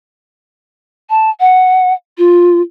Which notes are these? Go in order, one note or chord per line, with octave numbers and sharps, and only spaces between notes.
A5
F#5
F4